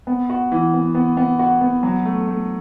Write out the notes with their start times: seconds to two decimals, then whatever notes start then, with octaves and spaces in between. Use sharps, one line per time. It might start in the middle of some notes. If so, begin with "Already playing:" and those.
0.07 B3
0.30 F#4
0.52 E3
0.74 B3
0.95 B3
1.17 B3
1.39 F#4
1.61 B3
1.83 F#3
2.05 A3
2.27 A3